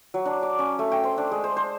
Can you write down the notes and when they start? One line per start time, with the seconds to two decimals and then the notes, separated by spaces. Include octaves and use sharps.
0.14 F#3
0.25 D4
0.43 D6
0.59 C#4
0.79 A3
0.92 G5
1.04 C5
1.18 D4
1.31 G#3
1.44 C5
1.57 C5